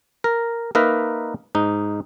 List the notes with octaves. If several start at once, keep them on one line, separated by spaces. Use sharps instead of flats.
A#4
A#3 D#4 A#4 B4 E5
G#2 D#4